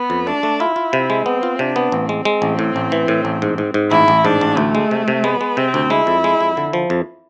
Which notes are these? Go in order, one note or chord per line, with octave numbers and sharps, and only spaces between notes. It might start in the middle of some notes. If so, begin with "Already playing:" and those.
Already playing: B3
F2
A3 D4
A3
E4 F4
F4
C3
G#3
B3 C4
F4
C3 D4
B3
A1 C4
G#3
G#3
A1
A2
A1
E3
A2
A1
G#2
G#2
G#2
A1 E4
A1
G#2 D4
A1
D2 A3
G#3
C3
C3
G#3 B3
G#3
C3 C4
D2
G#3 E4
F2
G#3
F2
D3
F3
F2